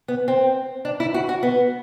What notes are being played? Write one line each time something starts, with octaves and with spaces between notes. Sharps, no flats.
B3
C4
D4
E4
F#4
F#4
B3